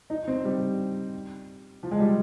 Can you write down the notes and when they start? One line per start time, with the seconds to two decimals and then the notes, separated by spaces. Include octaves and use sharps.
0.10 D#4
0.28 C4
0.45 G3
1.83 F3
1.91 G#3
2.00 G3